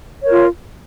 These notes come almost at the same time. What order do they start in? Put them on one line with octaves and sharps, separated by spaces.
C#5 A#4 F4